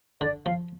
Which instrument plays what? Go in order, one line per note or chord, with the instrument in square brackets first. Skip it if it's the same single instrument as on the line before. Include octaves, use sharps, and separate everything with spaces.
[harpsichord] D3 [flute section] D5
[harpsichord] F3 [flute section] F5